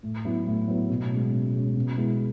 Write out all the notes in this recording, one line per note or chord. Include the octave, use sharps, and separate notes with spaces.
A2
F#3 B3 E4
A2
F#3 B3 E4
B2
G#3 C#4
B2
G#3 C#4
B2
G#3 B3 E4